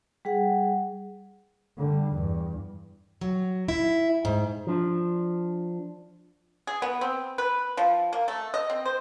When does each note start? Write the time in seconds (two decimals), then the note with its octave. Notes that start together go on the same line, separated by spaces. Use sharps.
0.25 G3 G#4 F#5
1.78 D3 G3
2.13 E2 G2
3.21 F#3
3.68 E4
4.25 G#2
4.67 F3 D4
6.67 G#4
6.82 B3
7.01 C4
7.38 B4
7.77 F3
8.13 A#3
8.28 A3
8.54 D#5
8.70 C4
8.85 C5